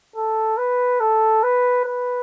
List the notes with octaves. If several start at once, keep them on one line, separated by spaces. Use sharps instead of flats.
A4
B4
A4
B4
B4